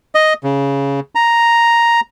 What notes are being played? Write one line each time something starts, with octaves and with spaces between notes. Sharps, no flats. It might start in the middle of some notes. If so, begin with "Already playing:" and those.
D#5
C#3
A#5